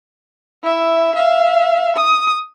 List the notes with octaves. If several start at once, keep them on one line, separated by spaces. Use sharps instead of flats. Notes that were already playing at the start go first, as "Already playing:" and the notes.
E4 E5
E5 F5
D#6